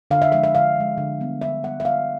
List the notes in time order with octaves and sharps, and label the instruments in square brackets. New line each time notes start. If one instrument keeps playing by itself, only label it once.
[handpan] D3 F5
E5
F3 G#3 E5
E5
D3 F5
F3 G#3
D3
G3 B3
D3 E5
G3 B3 F#5
E5
D3 F5